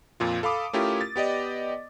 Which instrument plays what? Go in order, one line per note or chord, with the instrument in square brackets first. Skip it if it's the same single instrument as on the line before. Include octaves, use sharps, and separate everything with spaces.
[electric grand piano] F2 A#2 F4
A4 F5 B5 D6 D#6
A3 C#4 E4 F4 G4 A#4
A6
B3 G4 D5 D#5